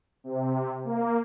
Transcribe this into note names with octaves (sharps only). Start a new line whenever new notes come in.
C3
A#3